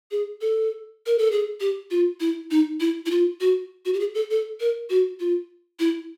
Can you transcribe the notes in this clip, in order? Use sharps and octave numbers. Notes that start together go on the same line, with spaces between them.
G#4
A4
A#4
A4
G#4
G4
F4
E4
D#4
E4
E4
F4
F#4
F#4
G4
G#4
A4
A4
A#4
F#4
F4
E4